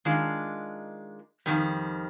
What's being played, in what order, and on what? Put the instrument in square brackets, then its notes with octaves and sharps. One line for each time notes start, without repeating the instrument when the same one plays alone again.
[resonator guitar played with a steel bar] D#3 G#3 D4 F4
F2 C3 D#3 G3